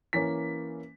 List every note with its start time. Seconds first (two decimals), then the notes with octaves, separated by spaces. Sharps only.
0.13 E3 A#3 C#4 B6